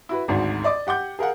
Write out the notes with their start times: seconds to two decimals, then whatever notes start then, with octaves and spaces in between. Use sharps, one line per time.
0.09 E4 F#4 B4
0.28 G#1 D2 G#2
0.64 D5 D#5 D6
0.87 G4 F#5 D6 G6
1.19 G#4 A#4 F5 F#5